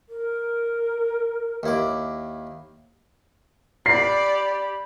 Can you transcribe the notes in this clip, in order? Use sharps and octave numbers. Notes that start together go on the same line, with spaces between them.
A#4
D#2 E4 D6
G4 D5 B5 C7